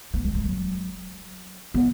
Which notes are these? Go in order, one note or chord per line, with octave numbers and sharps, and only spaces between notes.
B3
G#3
G#3
F#3
B3